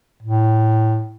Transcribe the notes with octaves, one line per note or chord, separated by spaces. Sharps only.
A2